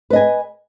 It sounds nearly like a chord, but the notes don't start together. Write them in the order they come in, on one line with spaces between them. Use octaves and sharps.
B4 D#5 G#5